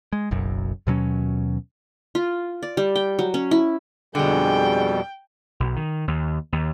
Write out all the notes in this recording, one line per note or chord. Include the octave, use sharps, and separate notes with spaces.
G#3
F#1 B1 F#2
D#2 B2 F#3 C#4
F4
D5
G3
G5
F#3
C#4
E4
F2 B2 D3 G3 G#3 G#4 G5
B1
D#3
D#2
D#2